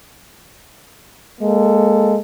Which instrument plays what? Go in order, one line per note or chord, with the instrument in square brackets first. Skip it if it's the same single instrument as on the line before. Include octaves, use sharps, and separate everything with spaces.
[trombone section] G#3 A#3 A4